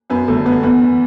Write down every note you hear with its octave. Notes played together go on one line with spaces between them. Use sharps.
F#2 B3 B4
G1 A3 A4
G1 B3 B4
E2 B3 B4
E2